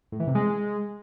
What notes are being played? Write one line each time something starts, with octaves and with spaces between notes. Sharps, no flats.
A2
E3
C3
G#3